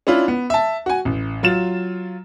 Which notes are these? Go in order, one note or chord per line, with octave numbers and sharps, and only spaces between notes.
C#4 D4 E4 F4
B3
E5 A5
F#4 G#5
A1
F#3 F4 A6 E7